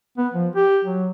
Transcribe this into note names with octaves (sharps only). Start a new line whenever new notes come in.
B3
F3
G4
F#3